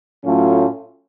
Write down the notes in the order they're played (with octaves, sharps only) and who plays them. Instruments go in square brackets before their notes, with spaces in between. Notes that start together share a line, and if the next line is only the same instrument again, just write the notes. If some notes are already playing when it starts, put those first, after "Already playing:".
[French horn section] A2 F#3 A3 C#4 F4